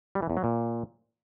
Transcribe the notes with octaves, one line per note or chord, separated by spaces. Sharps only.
G3
E3
E2
F#3
A#2